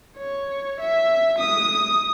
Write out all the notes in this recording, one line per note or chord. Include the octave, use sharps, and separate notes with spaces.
C#5
E5
D#6